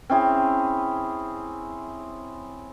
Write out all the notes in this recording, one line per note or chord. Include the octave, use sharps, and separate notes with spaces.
C4 C#4 E4 G#4